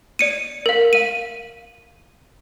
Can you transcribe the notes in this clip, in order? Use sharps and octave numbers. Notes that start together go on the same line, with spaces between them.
D5 C#7 D#7
A#4 F5
F5 D#7